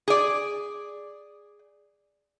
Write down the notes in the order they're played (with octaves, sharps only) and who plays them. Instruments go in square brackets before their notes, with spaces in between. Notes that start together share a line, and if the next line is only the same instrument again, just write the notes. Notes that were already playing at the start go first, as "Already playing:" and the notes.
[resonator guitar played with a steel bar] G#4 D5